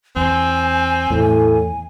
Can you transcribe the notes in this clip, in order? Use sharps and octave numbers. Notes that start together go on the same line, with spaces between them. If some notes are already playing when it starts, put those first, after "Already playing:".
E2 C4 G#5
E2 A2